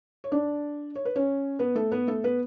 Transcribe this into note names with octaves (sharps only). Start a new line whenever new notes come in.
C#5
D4 D5
C#5
B4
C#4 C#5
B3 B4
A3 A4
B3 B4
A3 A4
B3 B4